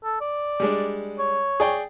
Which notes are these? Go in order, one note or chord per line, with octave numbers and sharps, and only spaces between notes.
A4
D5
G3 G#3 D4
C#5
G#4 D5 G5